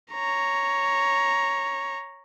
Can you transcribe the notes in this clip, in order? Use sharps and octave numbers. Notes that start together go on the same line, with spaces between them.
C#5 A#5